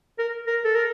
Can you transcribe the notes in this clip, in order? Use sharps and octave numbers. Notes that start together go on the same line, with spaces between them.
A#4
A#4
A4
A#4